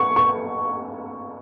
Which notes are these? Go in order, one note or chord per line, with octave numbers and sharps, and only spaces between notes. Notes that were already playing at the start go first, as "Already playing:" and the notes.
Already playing: C#6
C#6